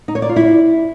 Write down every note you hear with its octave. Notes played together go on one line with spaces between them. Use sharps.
D#4
C#5
D5
F4
E4